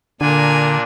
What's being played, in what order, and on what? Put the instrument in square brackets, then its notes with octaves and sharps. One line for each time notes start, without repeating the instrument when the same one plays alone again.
[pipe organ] A#2 D4 [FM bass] D3 [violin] A#4 G#5